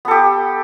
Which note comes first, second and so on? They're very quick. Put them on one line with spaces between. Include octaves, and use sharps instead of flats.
B3 A4 G4